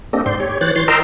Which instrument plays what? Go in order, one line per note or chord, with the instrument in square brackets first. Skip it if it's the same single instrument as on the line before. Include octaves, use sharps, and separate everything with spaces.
[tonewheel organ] A#3 C4 D4 G4 A4 D#5
G#2 C5 D5 C6
G4 C#5
E3 C5 C#5 F#6 A6
E3 C#5 C6 A6
A#4 D#5 G5 A#5 C6 E6